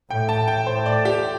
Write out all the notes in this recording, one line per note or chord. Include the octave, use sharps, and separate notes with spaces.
A2 G5
A5
G5
A2 C5
D5
G4